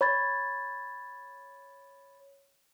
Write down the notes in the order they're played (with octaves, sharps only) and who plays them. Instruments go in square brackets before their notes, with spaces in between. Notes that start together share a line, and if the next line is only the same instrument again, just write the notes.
[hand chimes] C#5 B5 G#6 A6